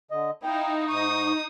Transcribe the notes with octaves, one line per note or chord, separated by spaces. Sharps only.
D3 D#5
D#4 E4 F5 G5
G#2 C#6 D#6